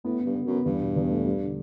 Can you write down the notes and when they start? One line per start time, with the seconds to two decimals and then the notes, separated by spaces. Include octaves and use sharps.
0.04 A2 B3
0.20 B3
0.26 G2
0.35 B3
0.46 F#2 B3
0.65 E2 G2
0.81 B2
0.96 E2
1.11 A3
1.26 G3
1.41 D3